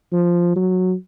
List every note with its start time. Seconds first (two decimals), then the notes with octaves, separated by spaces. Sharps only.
0.12 F3
0.56 F#3